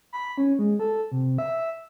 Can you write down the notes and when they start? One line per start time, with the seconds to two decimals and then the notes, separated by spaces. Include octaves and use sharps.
0.13 B5
0.38 C#4
0.59 G#3
0.80 A4
1.12 C3
1.39 E5